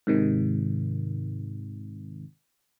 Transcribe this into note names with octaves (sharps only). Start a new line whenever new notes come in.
G#2 C3 D#3